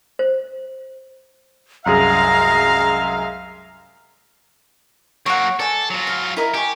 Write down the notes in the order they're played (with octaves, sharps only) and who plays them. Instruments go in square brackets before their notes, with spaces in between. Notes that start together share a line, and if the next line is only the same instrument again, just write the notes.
[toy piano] C5
[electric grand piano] C2 F#2 G#4 [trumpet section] G#3 E5 F5 [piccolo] A#5
[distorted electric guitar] F#3 A#3 [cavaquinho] C#5 F#5
[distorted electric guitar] A4 [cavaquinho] D5 G#5
[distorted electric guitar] F#3 F4
[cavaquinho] F5
E4 A#4 D#5
[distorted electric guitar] G4 [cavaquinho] G#5 C#6